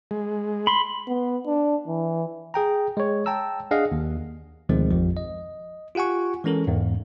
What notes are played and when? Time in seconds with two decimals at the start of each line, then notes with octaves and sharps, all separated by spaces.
0.11 G#3
0.67 B5 C6
1.08 B3
1.46 D4
1.87 E3
2.54 G#4 G5 A#5
2.97 G#3 C#5
3.26 G5 A5 A#5 E6
3.71 D4 G#4 D#5 F5 F#5
3.92 D#2
4.69 D2 B2 D#3 F3 G#3 C4
4.91 A1 F2 F3
5.17 D#5
5.95 F4 G4 F#5 G#5 C#6
6.44 E3 G#3 C#4 A4 A#4
6.67 E2 G#2